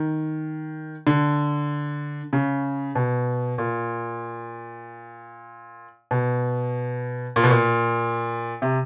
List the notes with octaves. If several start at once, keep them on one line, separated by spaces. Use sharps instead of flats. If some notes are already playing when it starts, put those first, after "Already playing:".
Already playing: D#3
D3
C#3
B2
A#2
B2
A#2
B2
A#2
C3